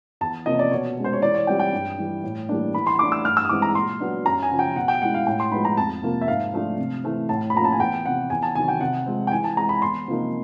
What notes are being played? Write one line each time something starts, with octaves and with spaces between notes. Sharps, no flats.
E2 A5
C3 F3 A#3 C#4 D#5
D5
B2 C#5
G#3 C#4
C5
C#5
E3 D5
C#5
G3 C4 F4 G5
G5
G2
E3 G3
A2
E3 G3 A#3 D4
E3 B5
C6
A3 D4 D6
E6
G2 F6
E6
D#6
E3 G#3 C4 D6
A#5
A#2 C6
F#3 B3 D4
F#2 A#5
G#5
C#3 F3
G5
B2 F#5
G5
G#3 C#4 E4 F#5
F5
A2 G5
C6
F3 G#3 B3 D#4 B5
A#5
F2 A5
C3 F3 A#3
E5
G#2 F5
F3 A3 D4 F4
C3
E3 A3 C4
A2 A5
B5
F3 A#3 C#4 F4 A#5
A5
G#5
E2 G5
C3 F3 F#5
E2 G#5
A5
C3 D#3 F#3 G#5
G5
C3 F#5
F3 G#3 C4
G5
E3 G#5
A5
G#3 C4 A#5
B5
E2 C6
C3 F3 A#3 D#4